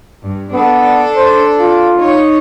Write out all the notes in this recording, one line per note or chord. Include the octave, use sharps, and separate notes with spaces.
G2
B3 D4 A4
C5
F4
D#4 C#5